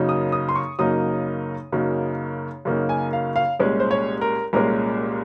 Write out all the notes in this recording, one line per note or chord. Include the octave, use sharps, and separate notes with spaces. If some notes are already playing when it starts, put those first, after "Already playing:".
Already playing: F#2 C#3 F#3 A#3 D#4
D#6
D#6
C6
C#6
F#2 C#3 F#3 A#3 D#4 D#6
F#2 C#3 F#3 A#3 D#4
F#2 C#3 F#3 A#3 D#4
G#5
F5
F5
C2 A#2 G#3 C#4
C5
C#5
A#4
C2 A#2 G#3 C#4 A#4